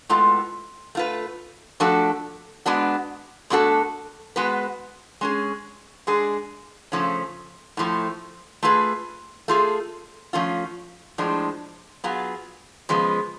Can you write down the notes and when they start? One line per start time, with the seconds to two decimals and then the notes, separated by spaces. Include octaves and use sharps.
0.09 A2 G#3 B3 F4 A4
0.95 A3 F4 B4
1.80 F3 A3 D4 F#4 A4
2.66 G#3 B3 D4 F#4
3.50 B2 A3 D4 F#4 A4
4.36 G#3 B3 F#4 B4
5.21 G#3 C#4 G#4
6.07 G#3 D4 G#4
6.92 C#3 F3 A3 C#4
7.77 A2 F3 A3
8.63 A3 F4 G#4 B4
9.48 A3 F4 G#4
10.33 F3 A3 C#4 F4
11.18 A2 F3 G#3 D4
12.04 F#3 B3 F4 G#4
12.89 C#3 F3 G#3 B3